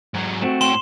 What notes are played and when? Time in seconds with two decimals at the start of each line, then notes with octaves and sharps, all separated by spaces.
0.14 G#2 F#3
0.42 A3 C4 F#4
0.61 A2 G5 C6 E7 G7